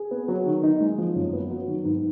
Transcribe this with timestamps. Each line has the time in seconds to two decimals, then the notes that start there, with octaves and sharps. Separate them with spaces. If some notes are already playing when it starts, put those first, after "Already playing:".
Already playing: G#4
0.11 B3
0.28 F#3
0.46 D#3
0.63 D#4
0.80 G#3
0.98 F3
1.16 F#2
1.33 B3
1.50 F#3
1.68 D#3
1.85 G#2